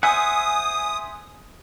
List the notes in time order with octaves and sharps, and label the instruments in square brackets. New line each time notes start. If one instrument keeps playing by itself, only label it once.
[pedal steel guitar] C5 E5 F#5 [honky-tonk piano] G#5 [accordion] D#6